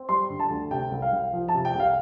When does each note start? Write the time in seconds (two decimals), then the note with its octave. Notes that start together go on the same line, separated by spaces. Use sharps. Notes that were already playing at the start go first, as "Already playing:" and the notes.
Already playing: C4
0.09 G3 C6
0.30 D3
0.39 A5
0.50 D2
0.71 C3 G5
0.91 C2
1.02 F5
1.13 C2
1.33 F3
1.48 A5
1.54 C3
1.65 G5
1.75 C2 F5